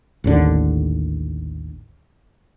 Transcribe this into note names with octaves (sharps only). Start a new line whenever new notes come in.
A1 D#2 D3